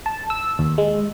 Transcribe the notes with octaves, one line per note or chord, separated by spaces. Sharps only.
A5
E6
D#2
G#3